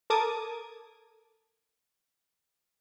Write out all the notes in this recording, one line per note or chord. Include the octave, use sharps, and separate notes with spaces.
A4 A#4 A5 D6 D#6 G#6